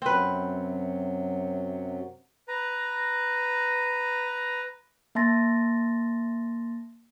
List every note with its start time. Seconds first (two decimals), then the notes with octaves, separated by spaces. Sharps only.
0.02 F#2 C3 F#3 C4 B4
2.48 B4 A#5
5.15 A#3 E5 A5 C6 A6 A#6